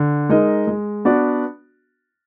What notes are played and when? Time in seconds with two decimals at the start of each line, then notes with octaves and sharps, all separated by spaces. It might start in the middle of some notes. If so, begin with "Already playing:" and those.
Already playing: D3
0.29 G#3 D#4 A#4 D#5
0.67 G#3
1.05 B3 D4 F#4 D5